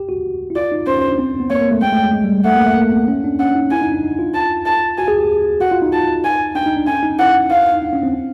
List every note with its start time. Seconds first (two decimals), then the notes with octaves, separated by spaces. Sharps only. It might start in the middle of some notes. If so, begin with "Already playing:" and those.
Already playing: G4
0.09 F#4
0.50 E4
0.56 F4 D5
0.72 D#4
0.87 C#4 C5
0.98 C#4
1.08 D4
1.19 C4
1.40 B3
1.50 A#3 C#5
1.61 A#3
1.71 A3
1.82 G#3 G5
1.92 A3
2.03 G#3
2.13 G#3
2.24 G3
2.45 A3 F#5
2.56 A#3
2.66 A3
2.77 A#3
2.92 B3
3.08 C#4
3.24 D4
3.40 C#4 F#5
3.55 D#4
3.71 E4 G#5
3.82 D#4
3.92 D4
4.03 D#4
4.19 F4
4.34 A5
4.66 A5
4.98 F#4 G#5
5.08 G#4
5.19 G4
5.61 F#4 F#5
5.72 F4
5.82 D#4
5.93 A5
6.24 G#5
6.55 D4 G5
6.66 D#4
6.77 D4
6.87 C#4 G#5
7.03 D#4
7.19 E4 F#5
7.51 F5
7.74 D#4
7.82 D4
7.93 C#4
8.03 C4